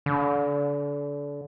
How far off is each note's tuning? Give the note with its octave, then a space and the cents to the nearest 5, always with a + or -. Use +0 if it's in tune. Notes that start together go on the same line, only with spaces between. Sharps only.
D3 -30